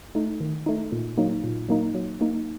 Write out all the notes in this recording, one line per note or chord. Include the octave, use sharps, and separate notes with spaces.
A3 D#4
D#3
A3 D#4
A#2
F#3 A#3 D#4
A#2
F#3 A#3 D#4
F#3
A#3 D#4